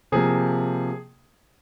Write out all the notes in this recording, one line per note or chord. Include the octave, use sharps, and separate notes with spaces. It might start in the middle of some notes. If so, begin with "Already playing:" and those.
C3 F3 A#3 G#4